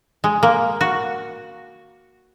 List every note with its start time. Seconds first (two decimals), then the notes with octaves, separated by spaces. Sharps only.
0.24 G#3
0.43 A#3
0.81 F#4